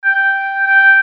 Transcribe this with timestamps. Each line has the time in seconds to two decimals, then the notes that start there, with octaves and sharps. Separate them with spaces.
0.04 G5
0.65 G5